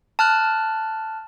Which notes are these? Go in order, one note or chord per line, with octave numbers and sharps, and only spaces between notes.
A5 F6 F#6